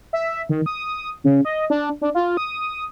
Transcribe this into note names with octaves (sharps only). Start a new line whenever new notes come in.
E5
D#3
D#6
C#3
D#5
D4
D4
F4
D#6